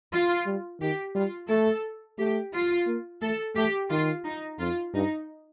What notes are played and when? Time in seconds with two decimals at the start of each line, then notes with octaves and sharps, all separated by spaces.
0.12 F4
0.46 G3
0.81 D#3 G4
1.15 G3 F4
1.49 A3 A4
2.18 A3 G4
2.53 F4
2.87 A#3
3.22 A3 A4
3.56 A3 G4
3.90 D#3 F4
4.24 D#4
4.59 F2 F4
4.94 G2 D#4